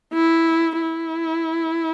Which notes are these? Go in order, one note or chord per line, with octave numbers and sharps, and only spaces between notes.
E4
E4